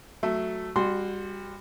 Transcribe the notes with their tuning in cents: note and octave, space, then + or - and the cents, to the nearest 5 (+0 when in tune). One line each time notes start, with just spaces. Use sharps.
F#3 +0 A3 +0
G3 +25 F#4 +0 C6 +0